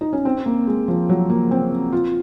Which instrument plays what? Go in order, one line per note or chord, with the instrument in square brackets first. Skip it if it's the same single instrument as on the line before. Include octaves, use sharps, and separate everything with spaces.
[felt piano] D#4
C#4
C4
A#3
G#3
F3
F#3
A#3
C4
F4